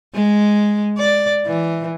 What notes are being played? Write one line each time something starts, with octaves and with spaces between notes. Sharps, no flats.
G#3
D5
E3